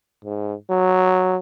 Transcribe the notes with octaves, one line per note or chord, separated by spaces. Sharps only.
G#2
F#3